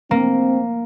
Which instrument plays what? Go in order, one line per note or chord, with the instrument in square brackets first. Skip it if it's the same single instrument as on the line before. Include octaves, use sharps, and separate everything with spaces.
[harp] A#3 [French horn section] C4